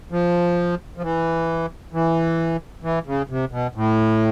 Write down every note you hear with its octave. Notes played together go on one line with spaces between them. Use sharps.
F3
F3
E3
E3
E3
C#3
C3
B2
A2